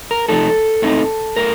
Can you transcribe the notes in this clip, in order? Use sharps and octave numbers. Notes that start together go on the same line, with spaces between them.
A#4
C3 F3 A3 D#4 A4
A2 A3 C4 D#4
A2 A3 A#4